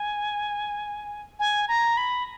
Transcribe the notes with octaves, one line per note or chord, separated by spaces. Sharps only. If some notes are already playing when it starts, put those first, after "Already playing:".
Already playing: G#5
G#5
A#5
B5